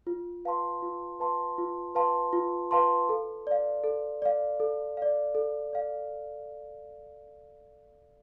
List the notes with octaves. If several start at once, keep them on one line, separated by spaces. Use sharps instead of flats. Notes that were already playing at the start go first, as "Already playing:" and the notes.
F4
B4 F5 A5 C6
F4
B4 F5 A5 C6
F4
B4 F5 A5 C6
F4
B4 F5 A5 C6
A4
D5 F5
A4
D5 F5
A4
D5 F5
A4
D5 F5